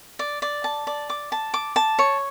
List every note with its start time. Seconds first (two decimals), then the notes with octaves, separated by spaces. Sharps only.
0.19 D5
0.42 D5
0.64 A5
0.87 D5
1.10 D6
1.32 A5
1.54 D6
1.76 A5
1.99 C#5